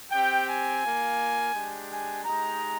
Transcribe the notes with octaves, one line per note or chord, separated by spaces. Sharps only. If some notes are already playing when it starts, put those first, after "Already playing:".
C4 G4 G5
G#5
A#3 F4
G#3 D4 G4
G#5
G#3 D#4 G4 A#5